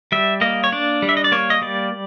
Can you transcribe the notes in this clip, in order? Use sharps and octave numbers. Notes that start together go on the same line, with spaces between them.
G3 E5
A#3 D#5
C#5
D4 D5
G3
E5
D#5
D5
A#3 C#5
D#5
G3 D5